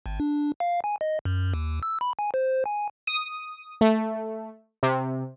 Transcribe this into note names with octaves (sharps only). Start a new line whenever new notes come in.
G#1
D4
F5
G#5
D#5
F#2
D#2
E6
B5
G#5
C5
G#5
D#6
A3
C3